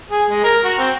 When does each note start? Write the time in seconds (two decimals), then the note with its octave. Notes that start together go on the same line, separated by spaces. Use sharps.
0.11 G#4
0.29 G#3
0.44 A#4
0.64 F#4
0.78 C4